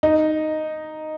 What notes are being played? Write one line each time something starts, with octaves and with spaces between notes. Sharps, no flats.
D#4